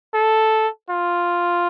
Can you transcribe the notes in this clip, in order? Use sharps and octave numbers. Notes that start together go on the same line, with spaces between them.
A4
F4